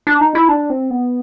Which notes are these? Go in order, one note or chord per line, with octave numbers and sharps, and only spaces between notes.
D4
D#4
E4
D4
C4
B3